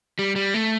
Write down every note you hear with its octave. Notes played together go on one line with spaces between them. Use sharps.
G3
G3
A3